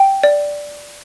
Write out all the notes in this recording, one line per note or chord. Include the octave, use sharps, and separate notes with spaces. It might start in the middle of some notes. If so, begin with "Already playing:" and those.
Already playing: G5
D5